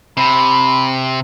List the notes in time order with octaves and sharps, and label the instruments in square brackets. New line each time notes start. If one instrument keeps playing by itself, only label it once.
[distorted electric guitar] C3 [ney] B5